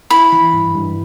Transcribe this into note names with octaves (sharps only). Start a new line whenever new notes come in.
E4 B5
E3
G2
G2